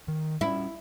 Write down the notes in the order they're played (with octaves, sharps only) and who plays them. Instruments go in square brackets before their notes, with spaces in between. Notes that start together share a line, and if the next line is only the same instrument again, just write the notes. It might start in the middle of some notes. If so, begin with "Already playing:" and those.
[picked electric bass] D#3
[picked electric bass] G3 C#4 [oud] E4